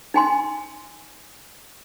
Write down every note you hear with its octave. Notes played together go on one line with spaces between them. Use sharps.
D#4 G#5 C6